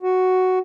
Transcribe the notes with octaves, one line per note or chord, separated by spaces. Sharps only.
F#4